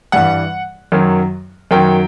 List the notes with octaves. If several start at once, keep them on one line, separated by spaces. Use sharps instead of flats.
G2 E3 G3 F#5
F#2 D#3 F#3
F#2 D#3 F#3 G5